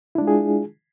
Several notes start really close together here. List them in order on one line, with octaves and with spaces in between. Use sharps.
E4 D4 G#3 F4 G#4